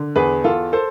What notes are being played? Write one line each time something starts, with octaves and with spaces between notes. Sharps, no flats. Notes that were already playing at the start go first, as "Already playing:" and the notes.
Already playing: D3
E2 G#4 B4
E2 F4 A4
A4 C5